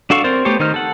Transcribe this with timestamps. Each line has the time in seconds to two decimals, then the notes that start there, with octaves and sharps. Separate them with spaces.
0.10 D4 F#4 A4 F5 C#6
0.24 C4 A#4 C5 D5
0.45 A3 B3 G4 C5 C#5
0.60 D#3 D#4 C5 F6
0.74 A4 F#5